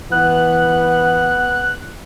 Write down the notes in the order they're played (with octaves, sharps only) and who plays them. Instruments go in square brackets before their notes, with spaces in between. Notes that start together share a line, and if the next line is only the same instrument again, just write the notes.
[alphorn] E3 [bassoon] B3 [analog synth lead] F#6